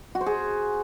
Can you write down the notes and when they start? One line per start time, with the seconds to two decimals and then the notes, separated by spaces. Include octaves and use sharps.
0.15 F#4
0.21 C5
0.26 G#4